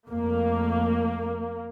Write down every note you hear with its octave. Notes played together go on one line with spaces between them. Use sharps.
F2 A3 A#3